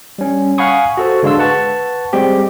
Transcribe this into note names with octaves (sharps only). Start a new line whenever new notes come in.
G3 C#4
F5 F#5 G#5 B5 C#6 D#6
F#4 A4 C5
D3 G#3 D4 F5 C6 E6
B4 F#5 A5 C#6
G3 G#3 C4 G4